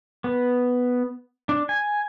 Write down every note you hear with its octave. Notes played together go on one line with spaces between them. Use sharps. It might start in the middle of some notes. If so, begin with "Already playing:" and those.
B3
D4
G#5